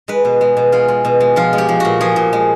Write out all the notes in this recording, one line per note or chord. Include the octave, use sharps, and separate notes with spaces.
G#3 B4
B2
G#3
B2
G#3 F4
G#3
B2
G#3
F3 F4
G#3
G4
F3
A#2 F#4
F3 G#4
A#2
G#3